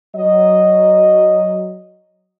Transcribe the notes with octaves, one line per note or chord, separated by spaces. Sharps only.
F#3 D#5